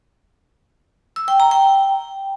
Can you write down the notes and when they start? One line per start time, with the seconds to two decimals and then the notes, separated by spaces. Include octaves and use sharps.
1.16 E6
1.28 G5
1.40 A#5
1.51 G5